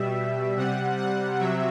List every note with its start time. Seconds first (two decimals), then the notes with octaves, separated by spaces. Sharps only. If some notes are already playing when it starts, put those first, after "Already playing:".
Already playing: B2 G3 E5
0.57 C3 G3 F#5
0.98 F#5
1.39 C3 F#3 E5